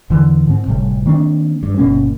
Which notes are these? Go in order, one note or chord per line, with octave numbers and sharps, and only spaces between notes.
E2 D3 E3
G#2 C4
F#1 A2 C3 G3
D#3 A#3 C4 D4
G2
G1 B2 A#3 C#4